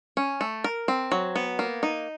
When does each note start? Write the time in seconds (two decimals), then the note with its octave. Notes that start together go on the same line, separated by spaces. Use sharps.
0.17 C#4
0.41 A3
0.64 A#4
0.88 C4
1.12 F#3
1.36 B3
1.59 A#3
1.83 D#4